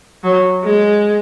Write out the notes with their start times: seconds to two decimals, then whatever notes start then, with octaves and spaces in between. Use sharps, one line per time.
0.24 F#3
0.64 G#3